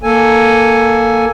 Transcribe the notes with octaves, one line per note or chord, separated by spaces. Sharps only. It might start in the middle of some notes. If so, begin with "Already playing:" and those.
A#3 A4 G#5